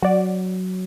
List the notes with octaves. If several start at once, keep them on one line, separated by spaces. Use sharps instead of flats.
F#3 F#4 D5